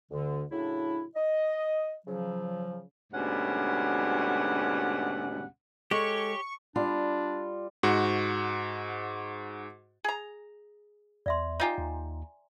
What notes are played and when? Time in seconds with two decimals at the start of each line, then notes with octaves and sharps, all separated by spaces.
0.11 D2 D3
0.51 A2 C#3 F#3 D4 E4
1.16 D#5
2.07 C#3 F3 F#3
3.13 D2 G#2 B2 G3 C#4 F#5
5.91 G#3 G4 A4 C#5 C#6
6.76 G3 D4 F4
7.83 G#2 F#4 F#5
10.04 G#4 A#5
11.26 E2 D5 E5 C6
11.60 D#4 F4 G4 G#5 A#5
11.78 D#2